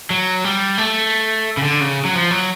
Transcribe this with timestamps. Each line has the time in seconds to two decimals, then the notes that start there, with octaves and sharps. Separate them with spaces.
0.10 F#3
0.44 G3
0.78 A3
1.57 C#3
1.63 D3
1.81 C#3
2.05 F#3
2.15 F3
2.31 F#3